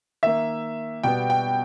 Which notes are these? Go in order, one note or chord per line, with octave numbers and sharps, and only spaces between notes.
D#3 A#3 E5
B2 G3 B3 G5
G5